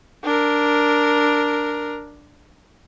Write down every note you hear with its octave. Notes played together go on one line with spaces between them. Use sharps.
D4 A#4